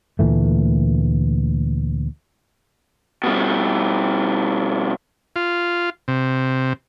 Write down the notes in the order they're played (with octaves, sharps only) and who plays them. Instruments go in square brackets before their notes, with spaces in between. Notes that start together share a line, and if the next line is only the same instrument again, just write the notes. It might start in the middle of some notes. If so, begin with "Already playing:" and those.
[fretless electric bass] D2 A#2 E3 A3
[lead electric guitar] B2 G3
[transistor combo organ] F4
C3